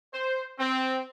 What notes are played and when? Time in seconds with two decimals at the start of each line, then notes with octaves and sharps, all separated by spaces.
0.14 C5
0.59 C4